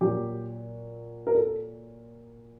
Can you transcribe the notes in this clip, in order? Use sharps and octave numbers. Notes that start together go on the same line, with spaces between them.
A#2 F#3 G4
A#4
A4